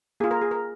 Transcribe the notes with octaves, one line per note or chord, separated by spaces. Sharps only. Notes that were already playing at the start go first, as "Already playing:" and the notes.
A#3 F4 G#4
A#4
G#4
A#4